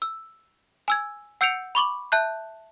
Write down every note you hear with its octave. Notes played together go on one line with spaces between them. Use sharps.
E6
G#5 E6 G#6
F#5 E6 G6 C#7 D7 F7
B5 C#6 D6 F#7
E5 A5 F#6 G6